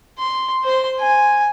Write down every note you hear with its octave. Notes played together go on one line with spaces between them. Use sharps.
C6
C5 C6
G#5